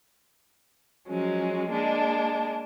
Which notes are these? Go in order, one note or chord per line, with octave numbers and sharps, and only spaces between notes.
F3 F#3 G#3 C#4
G#3 A#3 D4